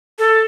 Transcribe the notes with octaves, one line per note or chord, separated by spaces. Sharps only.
A4